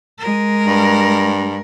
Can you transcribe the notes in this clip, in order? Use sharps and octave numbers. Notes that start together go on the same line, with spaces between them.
G#3 A#4
G2